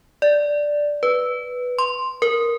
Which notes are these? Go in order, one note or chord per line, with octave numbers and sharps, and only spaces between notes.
D5
B4
C6
A#4